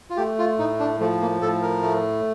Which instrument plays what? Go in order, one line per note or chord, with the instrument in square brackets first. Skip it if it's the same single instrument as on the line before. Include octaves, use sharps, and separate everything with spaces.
[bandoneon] F4
A3 G4
F4
A2 D#4
D4
F3 A3
A#3
A2 A4
A#4
A3